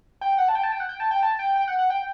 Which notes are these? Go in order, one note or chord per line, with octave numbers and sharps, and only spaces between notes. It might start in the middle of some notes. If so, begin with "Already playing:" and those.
G5
F#5
A5
G5
A5
G5
F#5
G5
A5
G5
A5
G5
G5
F#5
F#5
G5